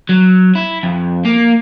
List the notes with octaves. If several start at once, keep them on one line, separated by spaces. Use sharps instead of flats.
F#3
E4
F2
A#3